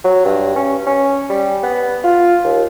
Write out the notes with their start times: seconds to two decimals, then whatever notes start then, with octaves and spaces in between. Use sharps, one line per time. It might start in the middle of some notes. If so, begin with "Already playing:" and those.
0.04 F#3
0.25 G2
0.56 C#4
0.86 C#4
1.30 G3
1.63 B3
2.04 F4
2.44 D#2